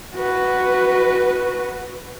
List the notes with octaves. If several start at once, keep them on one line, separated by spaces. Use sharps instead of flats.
F#4 B4